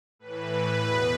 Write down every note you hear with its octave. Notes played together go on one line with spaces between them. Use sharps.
A2 E3 B4
E2 B2